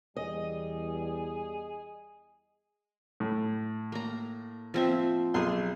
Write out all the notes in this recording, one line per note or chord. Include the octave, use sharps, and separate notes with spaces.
E2 G3 G#4 D#5
A2
A#3 A#5
F3 C4 E5
B1 G#4 C6